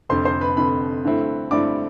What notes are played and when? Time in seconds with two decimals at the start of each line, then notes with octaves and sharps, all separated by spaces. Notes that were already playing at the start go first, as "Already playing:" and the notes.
0.09 F1 F2 D3 C5 C6
0.25 C5 C6
0.41 B4 B5
0.57 F1 F2 D3 B4 B5
1.05 G2 D3 A3 C4 E4
1.51 G2 D3 A3 C4 E4 D5 D6